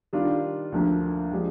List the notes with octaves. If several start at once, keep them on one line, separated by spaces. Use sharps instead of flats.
D#3 G3 D4 F4
D2 D3 F3 A#3
F3 G#3 D4 G4